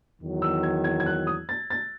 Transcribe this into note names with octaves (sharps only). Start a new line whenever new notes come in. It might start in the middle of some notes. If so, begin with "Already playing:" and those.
E2 D#3 F#3
E6
G#6
G#6
G#6
F#6
D#6
A6
A6